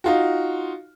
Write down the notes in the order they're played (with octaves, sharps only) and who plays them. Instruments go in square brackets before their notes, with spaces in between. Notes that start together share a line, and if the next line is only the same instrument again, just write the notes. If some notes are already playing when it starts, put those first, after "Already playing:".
[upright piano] D#4 F4 F#4